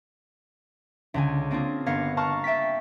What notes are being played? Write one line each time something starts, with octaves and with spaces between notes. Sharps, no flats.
C#2 D3 G#5
A#3 C4 D4 F4 G#4
G1 B3 A#4 F5 G#6 C#7
F5 A5 A#5 C#6 F6 F#6
E5 G5 A6 B6